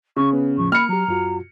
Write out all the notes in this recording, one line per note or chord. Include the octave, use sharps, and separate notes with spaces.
C#3 C#6
B3 C#4 B4
E2 A2 F3 C#6
A#3 B5 F6 C#7
F#3 G4 A#5
F#2 F4 F#4